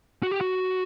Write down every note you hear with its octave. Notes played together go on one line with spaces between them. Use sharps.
F#4
G4
F#4